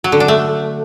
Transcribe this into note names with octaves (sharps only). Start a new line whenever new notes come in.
F#3
D3
D4
A3